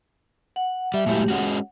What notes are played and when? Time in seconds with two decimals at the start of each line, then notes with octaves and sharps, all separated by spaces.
0.56 F#5
0.94 G3 E5
1.06 A#2 F#3 G#3 A3 E4 G4
1.28 G#3 C#4 F#4 F#5